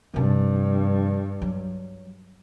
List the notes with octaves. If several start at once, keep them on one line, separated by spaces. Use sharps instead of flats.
G2 C3 F3
F#3